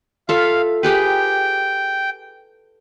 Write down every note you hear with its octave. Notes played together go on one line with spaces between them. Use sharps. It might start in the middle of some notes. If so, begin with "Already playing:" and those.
F4 A4 E5 F5
G4 G#4 B4 G5